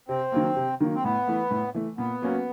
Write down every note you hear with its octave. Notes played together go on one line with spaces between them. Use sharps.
C3 C4
D#3 F#3 A#3
C3
D#3 F#3 A#3
C4
A2 B3
E3 A3
A2
E3 A3
A#2 B3
F#3 A#3 C#4 F#4